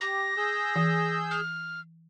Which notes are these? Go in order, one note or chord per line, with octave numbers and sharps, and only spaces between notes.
G4 A#6
G#4 E6 G6
E3
F6